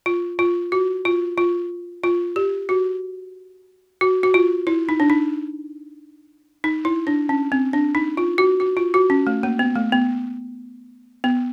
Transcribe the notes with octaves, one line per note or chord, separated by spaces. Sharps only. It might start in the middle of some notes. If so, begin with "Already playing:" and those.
F4
F4
F#4
F4
F4
F4
G4
F#4
F#4
F#4
F4
E4
D#4
D4
D#4
D#4
E4
D4
C#4
C4
D4
D#4
F4
F#4
F#4
F4
F#4
C#4
A3
A#3
B3
A3
B3
B3